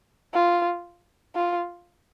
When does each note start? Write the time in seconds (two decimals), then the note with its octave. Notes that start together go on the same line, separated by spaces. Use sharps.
0.34 F4
1.35 F4